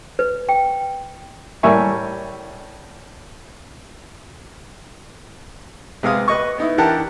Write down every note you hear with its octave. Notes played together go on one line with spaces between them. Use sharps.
B4
G5
A2 G3 A#4 E5 G#5 C#6
C3 G#3 B3 F5 D#6
B4 D#5 C#6
B3 D#4 E4
E3 D4 G4 A#4 F#5 A5